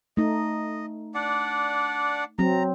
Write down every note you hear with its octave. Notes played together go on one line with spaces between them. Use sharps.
A3 D#4 D#5
D4 D5 F#5
F#3 C4 A#5